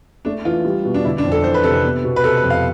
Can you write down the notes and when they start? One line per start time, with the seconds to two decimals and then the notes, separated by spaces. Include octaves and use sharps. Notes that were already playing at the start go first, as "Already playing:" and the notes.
0.25 A3 D4
0.45 E3 F4
0.65 G3
0.85 B2
0.94 D4
1.05 D3 E4
1.18 D4
1.25 F2
1.32 A4
1.44 E3 C5
1.54 B4
1.64 C3 A4
1.73 B4
1.84 B3
2.04 B2
2.16 B4
2.24 C3 A4
2.37 B4
2.44 F2
2.50 F5